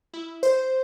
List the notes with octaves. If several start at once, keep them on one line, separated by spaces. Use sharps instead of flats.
E4
C5